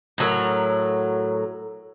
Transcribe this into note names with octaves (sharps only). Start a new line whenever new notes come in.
A2 F#3 A#4